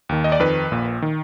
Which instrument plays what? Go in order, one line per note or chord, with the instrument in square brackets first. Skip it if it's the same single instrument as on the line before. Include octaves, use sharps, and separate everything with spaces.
[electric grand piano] D#2 D#3
D#5
D5
F2 D#3 B4
A#1 A#2
D#3